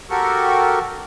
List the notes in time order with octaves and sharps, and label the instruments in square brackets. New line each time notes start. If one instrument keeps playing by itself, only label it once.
[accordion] F#4 G4 A4 A#4 C#6